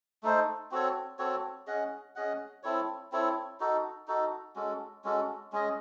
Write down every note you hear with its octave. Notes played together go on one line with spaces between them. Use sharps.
A3 D#4 A4 C5
C4 F#4 A4 C#5
C4 F#4 A4 C#5
C#4 G#4 D#5 F#5
C#4 G#4 D#5 F#5
C4 E4 A4 C#5
C4 E4 A4 C#5
D#4 F#4 A4
D#4 F#4 A4
G#3 C#4 F#4 A4
G#3 C#4 F#4 A4
G#3 C#4 G#4 D#5